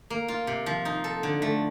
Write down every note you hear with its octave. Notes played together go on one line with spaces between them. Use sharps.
A#3
F4
C3
F3
D#4
A4
D3
A3